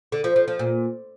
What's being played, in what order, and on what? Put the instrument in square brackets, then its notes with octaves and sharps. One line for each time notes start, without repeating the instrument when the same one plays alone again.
[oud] D3
F3
F3
F3
A#2